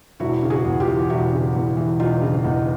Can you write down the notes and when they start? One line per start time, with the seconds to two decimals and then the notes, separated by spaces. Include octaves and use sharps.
0.20 E1 E4 F#4
0.43 C#3
0.50 F#4 G#4
0.65 E2
0.80 F4 G4
0.88 E3
1.10 E1 E4 F#4
1.33 C#3
1.55 E2
1.77 E3
1.99 E1 D#4 F4
2.22 C#3
2.44 E2 D#4